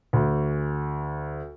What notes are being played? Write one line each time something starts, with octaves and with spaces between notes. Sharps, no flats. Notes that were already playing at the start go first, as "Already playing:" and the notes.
D2